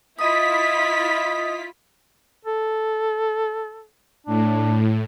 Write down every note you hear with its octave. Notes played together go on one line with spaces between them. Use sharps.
E4 F4 D#5 D#6 B6
A4
A2 D4